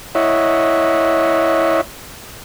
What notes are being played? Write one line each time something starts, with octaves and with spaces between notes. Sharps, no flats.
E4 C#5 D#5 E5 F#5